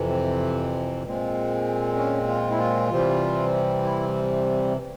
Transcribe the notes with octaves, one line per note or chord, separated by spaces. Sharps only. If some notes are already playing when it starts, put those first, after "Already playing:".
Already playing: F2 C3 E3
C4
A#2 G#3 C4
C#4
F4
E4
F4
C3 E3 G3 C4
E4